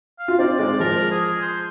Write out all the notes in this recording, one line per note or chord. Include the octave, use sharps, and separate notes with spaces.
F5
F4
C4 D#4 D5
G#3 C4 D5
F3 G#3 A#4
G#4
C5